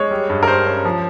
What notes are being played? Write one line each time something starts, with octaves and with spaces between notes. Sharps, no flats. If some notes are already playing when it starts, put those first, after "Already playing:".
Already playing: G#3 C#5
G3
G2
A#4
G2 C5
C#4
F3